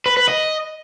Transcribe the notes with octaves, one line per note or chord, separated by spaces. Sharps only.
B4
B4
D#5